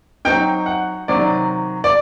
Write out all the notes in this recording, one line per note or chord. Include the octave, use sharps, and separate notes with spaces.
F#3 C4 D#4 G5
F#5
C3 D#3 F#3 D5
D5